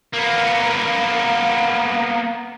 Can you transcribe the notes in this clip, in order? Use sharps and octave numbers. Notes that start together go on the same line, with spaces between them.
A#3 B3